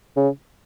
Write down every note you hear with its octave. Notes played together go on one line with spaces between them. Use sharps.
C#3